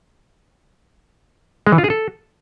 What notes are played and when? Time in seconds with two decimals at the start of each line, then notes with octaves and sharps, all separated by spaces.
1.67 G#3
1.72 E3
1.78 F4
1.84 G#4
1.90 A4